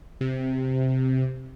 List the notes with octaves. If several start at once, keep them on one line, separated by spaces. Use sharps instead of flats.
C3